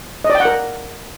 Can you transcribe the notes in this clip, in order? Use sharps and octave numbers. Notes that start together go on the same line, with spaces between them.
D#5
D5
G5
F#5
A#4